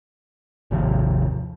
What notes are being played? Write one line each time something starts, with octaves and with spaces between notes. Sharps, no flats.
G#1 D#2 C3 F3